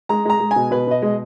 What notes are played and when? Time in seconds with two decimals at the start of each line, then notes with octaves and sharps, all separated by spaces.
0.09 G#3 A#5
0.25 G#3 A#5
0.40 G#3
0.51 B2 G#5
0.71 B2 B4
0.87 B2 D#5
1.02 G#3